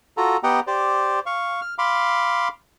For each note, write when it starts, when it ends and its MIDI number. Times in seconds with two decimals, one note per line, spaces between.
0.17 0.37 65
0.17 0.37 66
0.17 0.37 69
0.17 0.37 82
0.43 0.60 59
0.43 0.60 67
0.43 0.60 75
0.43 0.60 78
0.43 0.60 79
0.43 0.60 82
0.67 1.20 67
0.67 1.20 72
0.67 1.20 74
1.26 1.61 77
1.26 1.61 85
1.61 1.74 89
1.78 2.48 77
1.78 2.48 83
1.78 2.48 84
1.78 2.48 86